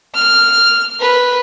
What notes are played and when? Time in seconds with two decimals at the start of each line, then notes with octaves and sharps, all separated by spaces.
0.15 F6
1.01 B4